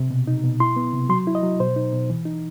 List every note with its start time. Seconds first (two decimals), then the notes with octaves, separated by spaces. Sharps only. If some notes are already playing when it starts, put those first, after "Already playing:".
Already playing: C3
0.11 B2
0.27 D#4
0.44 B2
0.60 E4 C6
0.76 B3
0.93 C3
1.09 F#3 C6
1.27 E4
1.35 D#5
1.43 F#3
1.60 B2 C5
1.76 D#4
1.92 B2
2.10 E3
2.26 D#4